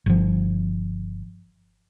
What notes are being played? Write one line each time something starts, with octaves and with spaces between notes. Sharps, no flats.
G1 F3